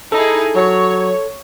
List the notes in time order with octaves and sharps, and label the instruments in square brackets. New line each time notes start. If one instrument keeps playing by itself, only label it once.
[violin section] D#4 E4 G#4 [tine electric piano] A4
[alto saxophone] F#3 [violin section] C#5